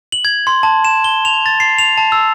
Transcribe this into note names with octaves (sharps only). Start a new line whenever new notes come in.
F#7
G#6
C6
A5
E7
G7
F7
A6
C7
F7
A5
E6